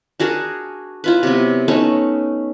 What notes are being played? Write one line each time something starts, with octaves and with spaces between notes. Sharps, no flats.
D4 F#4 G#4 A#4
E4 F4 B4
C3 F#3 B3
A3 B3 C#4 D#4